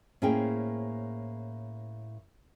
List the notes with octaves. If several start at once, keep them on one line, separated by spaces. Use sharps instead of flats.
A2 A#3 C#4 G#4 C5 G5